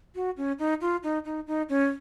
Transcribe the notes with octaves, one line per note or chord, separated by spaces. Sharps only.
F#4
C#4
D#4
F4
D#4
D#4
D#4
C#4